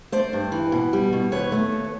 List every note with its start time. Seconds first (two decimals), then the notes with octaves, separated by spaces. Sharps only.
0.12 A3 C5 D5
0.33 G2
0.52 E3
0.72 B2
0.93 G3
1.13 B2
1.32 D#2 B4 C#5
1.52 A3
1.72 D#2